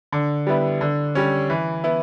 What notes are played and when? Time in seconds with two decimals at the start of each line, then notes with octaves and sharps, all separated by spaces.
0.12 D3
0.47 G3 B3 E4
0.81 D3
1.15 G3 C#4
1.50 E3
1.84 B3 E4